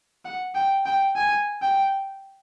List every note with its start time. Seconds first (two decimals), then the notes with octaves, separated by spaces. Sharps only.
0.25 F#5
0.55 G5
0.86 G5
1.16 G#5
1.62 G5